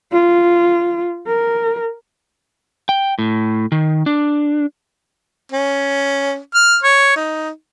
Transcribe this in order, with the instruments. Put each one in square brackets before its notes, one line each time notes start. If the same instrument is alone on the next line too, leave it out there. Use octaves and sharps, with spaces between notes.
[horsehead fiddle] F4
A#4
[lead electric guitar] G5
A2
D#3
D4
[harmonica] C#4
F6
C#5
D#4